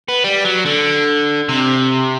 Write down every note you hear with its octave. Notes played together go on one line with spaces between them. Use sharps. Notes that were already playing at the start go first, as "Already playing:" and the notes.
B3
G3
F#3
D3
C3